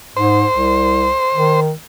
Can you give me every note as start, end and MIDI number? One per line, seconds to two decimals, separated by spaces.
0.17 0.45 44
0.17 1.60 72
0.55 1.12 36
1.34 1.71 51